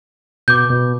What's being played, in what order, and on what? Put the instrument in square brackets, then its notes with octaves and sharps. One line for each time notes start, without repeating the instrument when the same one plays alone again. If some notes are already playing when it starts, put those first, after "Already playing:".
[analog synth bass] B2 [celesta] D6 G6
[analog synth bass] B2